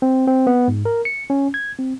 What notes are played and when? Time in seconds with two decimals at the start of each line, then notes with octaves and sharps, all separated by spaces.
0.02 C4
0.27 C4
0.47 B3
0.68 G#2
0.85 A#4
1.05 C#7
1.30 C#4
1.54 G#6
1.79 C4